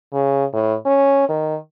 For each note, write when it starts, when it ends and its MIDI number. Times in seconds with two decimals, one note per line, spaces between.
0.13 0.44 49
0.53 0.74 45
0.86 1.26 61
1.29 1.56 51